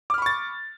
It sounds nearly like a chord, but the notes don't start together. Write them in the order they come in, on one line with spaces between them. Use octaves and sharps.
D6 F6 B5 C#6 A6